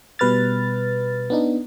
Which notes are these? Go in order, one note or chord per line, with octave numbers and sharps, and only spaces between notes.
B2 G3 B4 F6 A6
B3 D4 D#4